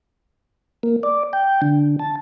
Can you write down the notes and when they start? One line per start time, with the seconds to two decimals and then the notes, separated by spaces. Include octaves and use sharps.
0.83 A#3
1.03 D5
1.33 G5
1.62 D3
1.99 A5